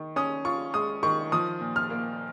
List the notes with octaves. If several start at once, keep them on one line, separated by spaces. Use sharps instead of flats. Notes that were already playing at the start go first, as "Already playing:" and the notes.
Already playing: D#3
C#4 D#6
F4 C#6
G#3 D#6
D#3 C#6
F3 D#6
A#2
F6
A#3